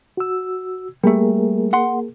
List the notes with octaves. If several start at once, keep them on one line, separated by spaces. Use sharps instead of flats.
F#4 E6
G3 A3 A#3 G#4 A#4
F#5 C6